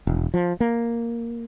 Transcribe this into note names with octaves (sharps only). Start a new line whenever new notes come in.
E1
F3
A#3